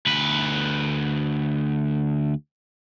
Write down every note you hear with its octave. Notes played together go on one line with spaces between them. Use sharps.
D2 B4